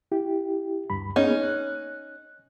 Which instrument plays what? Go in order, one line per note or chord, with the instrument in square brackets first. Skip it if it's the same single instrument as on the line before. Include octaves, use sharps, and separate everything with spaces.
[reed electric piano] E4 G4
D2 G2 B5
[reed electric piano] A#3 B3 G#4 [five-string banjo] C#4 D#4
[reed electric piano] F#6